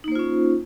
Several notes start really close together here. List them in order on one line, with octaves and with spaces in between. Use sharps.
D#4 A#3 C5 F4 C#4